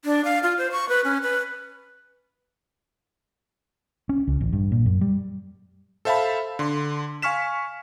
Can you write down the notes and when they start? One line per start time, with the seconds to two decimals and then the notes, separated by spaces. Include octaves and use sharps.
0.05 D4
0.25 F5
0.43 F4
0.58 C5
0.72 C#6
0.89 B4
1.04 C#4
1.22 B4
4.09 C#4
4.27 C#2
4.41 A1
4.53 G2
4.72 A#2
4.86 F#2
5.01 G3
6.05 A4 C5 E5 F5 A5 B5
6.59 D3 C6
7.22 F5 G#5 C#6 F6 B6 E7